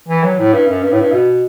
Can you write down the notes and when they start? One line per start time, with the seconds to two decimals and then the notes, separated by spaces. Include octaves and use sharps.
0.08 E3
0.23 F#3
0.38 A2
0.53 G2
0.68 F#2
0.83 G2
0.92 A2
1.00 G2
1.12 B2